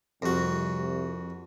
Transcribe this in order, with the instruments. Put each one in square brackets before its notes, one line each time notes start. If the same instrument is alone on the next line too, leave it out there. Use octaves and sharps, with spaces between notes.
[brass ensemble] C2 [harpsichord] F2 F#4